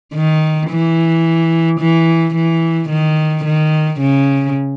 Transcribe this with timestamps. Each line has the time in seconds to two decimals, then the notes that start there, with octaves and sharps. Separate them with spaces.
0.14 D#3
0.70 E3
1.80 E3
2.35 E3
2.90 D#3
3.45 D#3
4.01 C#3